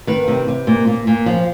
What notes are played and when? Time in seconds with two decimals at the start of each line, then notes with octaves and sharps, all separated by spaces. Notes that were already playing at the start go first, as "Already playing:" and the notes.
0.07 D#3 B4
0.28 C3
0.48 C3
0.67 A#2
0.87 A#2
1.07 A#2
1.26 F3